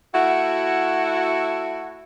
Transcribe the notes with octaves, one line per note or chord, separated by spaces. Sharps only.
A3 E4 F#4